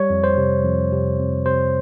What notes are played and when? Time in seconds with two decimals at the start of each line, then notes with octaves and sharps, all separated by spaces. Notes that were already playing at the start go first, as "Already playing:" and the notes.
Already playing: G3 C#5
0.10 F2
0.24 C5
0.37 C3
0.64 F2
0.92 C3
1.18 F2
1.45 C3 C5